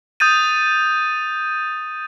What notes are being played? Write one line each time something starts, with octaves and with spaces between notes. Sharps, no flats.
D#6 G6 A6 D#7